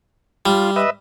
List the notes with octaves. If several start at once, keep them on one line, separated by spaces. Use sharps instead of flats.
G3 F4
B4 D#5 E5